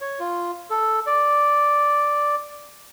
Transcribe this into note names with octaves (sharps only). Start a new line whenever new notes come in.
C#5
F4
A4
D5